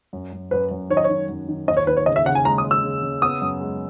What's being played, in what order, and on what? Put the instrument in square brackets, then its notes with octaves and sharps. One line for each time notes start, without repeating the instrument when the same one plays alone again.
[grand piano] F#2
F#2
[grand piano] F#2 [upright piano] B4
[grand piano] F#2
[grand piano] D#3 [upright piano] C#5
[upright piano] D#5
[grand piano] D#3 [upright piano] C#5
[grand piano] F#2
D#3
[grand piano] D#2 [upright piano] D#5
[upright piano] C#5
[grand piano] D#2 [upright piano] B4
[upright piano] C#5
[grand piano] C#3 [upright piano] D#5
[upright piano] E5
[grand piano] C#3 [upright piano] F#5
[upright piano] G#5
[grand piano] G#3 [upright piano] A#5
[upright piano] D#6
[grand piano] G#3
[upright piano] E6
[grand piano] C#3
C#3
[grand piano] B3 [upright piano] D#6
[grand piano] F#2
G#3